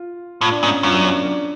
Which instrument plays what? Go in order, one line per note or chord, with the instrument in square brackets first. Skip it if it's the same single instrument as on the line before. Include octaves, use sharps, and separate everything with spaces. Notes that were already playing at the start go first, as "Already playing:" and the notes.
Already playing: [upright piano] F4
[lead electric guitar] A2 [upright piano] F4
[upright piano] D4
[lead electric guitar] G#2 [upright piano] C#4
[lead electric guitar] F#2 [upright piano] F4
[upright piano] D4
C#4
D4
D4